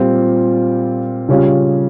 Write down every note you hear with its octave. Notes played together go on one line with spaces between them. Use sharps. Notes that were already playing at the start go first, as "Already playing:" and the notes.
Already playing: A#2 G3 C4 F4
C#3 G3 C#4 F4